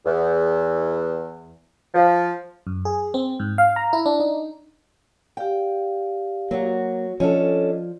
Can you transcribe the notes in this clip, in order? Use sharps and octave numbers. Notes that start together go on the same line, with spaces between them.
E2
F3
F#2
G#4
C4
G#2
F5
A#5
E4
D4
D#4
G4 D5 F5 G5
F#3 A#3 F#4
F3 C#4 D4 A4 D5 D#5